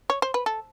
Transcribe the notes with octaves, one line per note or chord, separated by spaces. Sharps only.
C#5
C5
B4
A4